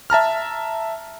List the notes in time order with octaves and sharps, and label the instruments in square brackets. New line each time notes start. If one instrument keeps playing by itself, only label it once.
[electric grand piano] E5 A5 A#5 F6